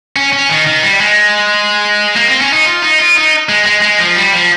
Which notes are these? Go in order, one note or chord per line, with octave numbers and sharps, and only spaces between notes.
C#4
C#4
D#3
D#3
G3
G#3
A#3
C4
C#4
D#4
F4
D#4
F4
D#4
G#3
G#3
G#3
F3
G3
F3